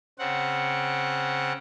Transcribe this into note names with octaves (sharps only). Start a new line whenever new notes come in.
C#3 C4 F#5